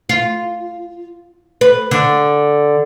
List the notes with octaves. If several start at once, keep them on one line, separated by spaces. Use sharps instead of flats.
F4
B4
D3